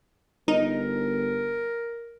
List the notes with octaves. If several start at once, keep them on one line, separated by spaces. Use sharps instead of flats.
G1 D#4 A#4